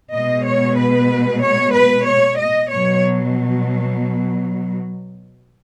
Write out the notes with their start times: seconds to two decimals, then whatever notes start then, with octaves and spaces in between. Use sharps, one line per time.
0.12 B2 G#3 D#5
0.45 C#5
0.77 B4
1.42 C#5
1.74 B4
2.06 C#5
2.38 D#5
2.70 B2 F#3 C#5